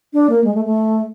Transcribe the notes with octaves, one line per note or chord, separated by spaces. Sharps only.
D4
A#3
G#3
A3
A3